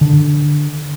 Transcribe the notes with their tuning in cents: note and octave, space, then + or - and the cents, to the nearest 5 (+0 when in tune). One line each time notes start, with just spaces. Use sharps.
D3 +5